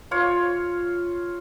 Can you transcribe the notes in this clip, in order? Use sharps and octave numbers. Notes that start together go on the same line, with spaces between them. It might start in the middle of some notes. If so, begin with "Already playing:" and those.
F4 C#5